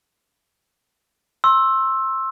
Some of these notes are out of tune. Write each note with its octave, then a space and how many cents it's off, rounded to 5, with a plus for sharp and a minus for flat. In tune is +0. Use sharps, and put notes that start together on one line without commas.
C6 +25 E6 +0